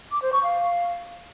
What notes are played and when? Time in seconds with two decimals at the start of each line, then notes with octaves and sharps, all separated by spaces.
0.12 D6
0.22 C5
0.33 C#6
0.43 F5